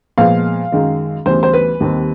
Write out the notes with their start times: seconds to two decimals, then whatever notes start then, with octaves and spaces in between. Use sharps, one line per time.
0.18 A#2 F3 G#3 B3 F5
0.72 F#2 D#3 G#3
1.26 D2 C#3 E3 G3 B3 C5
1.43 C5
1.53 B4
1.81 D#2 D#3 G3 C4